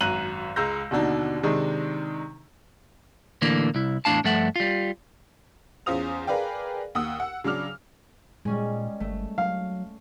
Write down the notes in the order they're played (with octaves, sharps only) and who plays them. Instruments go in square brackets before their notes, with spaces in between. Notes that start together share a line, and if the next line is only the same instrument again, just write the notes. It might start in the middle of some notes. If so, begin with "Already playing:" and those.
[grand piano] G#1 F#2 A#5 F#6 D#7 F#7
C#2 G#3 A#5 E6 G6 A#6
D#2 B2 D3 D4 D#4
C3 D#3 G#3 D4 D#4
[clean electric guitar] A2 D3 E3 A#3 D4
C2 E4
E2 A2 D4 F5 A5
G2 F3 A3 A4 E5 F#5
G3 F4
[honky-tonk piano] E2 C#4 F4 C5 D#6 F7
G#4 A#4 B4 D5 F5 G5
D#2 F#5 D#6 E6
F#5
C#3 F#3 D4 D6 F6 F7
[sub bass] A#2 [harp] G3 C#4 G#4 [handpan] G#3
[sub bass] G1 [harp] A3
[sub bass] F#3 [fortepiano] F5